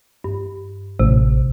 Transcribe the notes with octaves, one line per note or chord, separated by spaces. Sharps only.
G2
A1 C3